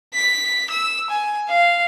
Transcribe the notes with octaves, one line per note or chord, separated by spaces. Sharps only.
B6
E6
G#5
F5